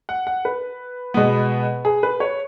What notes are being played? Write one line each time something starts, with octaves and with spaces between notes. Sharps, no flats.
F#5
F#5
B4
B2 G#3 B3
G#4
B4
C#5